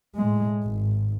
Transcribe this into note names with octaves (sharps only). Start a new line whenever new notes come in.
A2 G#3
G#1